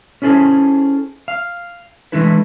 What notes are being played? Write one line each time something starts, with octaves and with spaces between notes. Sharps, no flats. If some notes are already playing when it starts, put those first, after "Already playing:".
C#4 E4 G#4 A4 C5
F5
E3 G#3 A3 D4 E4 B4